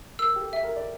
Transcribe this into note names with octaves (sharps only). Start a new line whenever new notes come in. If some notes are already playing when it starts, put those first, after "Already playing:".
A#4 E6
G4
A4
E5
A#4
D5